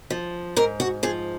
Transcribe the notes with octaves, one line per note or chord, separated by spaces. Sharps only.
F3
G#2 A#4
F#4
F3 G#4